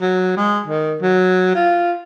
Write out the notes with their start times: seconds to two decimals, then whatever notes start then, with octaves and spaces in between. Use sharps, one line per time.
0.01 F#3
0.37 G#3
0.67 D#3
1.02 F#3
1.55 F4